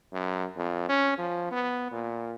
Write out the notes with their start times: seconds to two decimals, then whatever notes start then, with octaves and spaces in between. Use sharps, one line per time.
0.13 F#2
0.56 F2
0.89 C#4
1.18 F3
1.52 B3
1.92 A#2